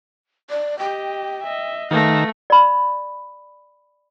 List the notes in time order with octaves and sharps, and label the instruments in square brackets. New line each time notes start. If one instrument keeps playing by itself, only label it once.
[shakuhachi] D5
[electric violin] G4 D#5 [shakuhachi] G5
[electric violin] D#5 E5
[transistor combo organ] D#3 [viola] A3 [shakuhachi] B4 [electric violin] F5 A#6
[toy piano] D5 B5